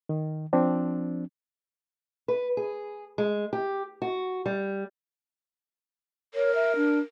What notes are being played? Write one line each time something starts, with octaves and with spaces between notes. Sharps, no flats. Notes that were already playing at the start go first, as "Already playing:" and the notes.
D#3
F3 C4 D4
B4
G#4
G#3
G4
F#4
G3
A#4 C#5
E5
D4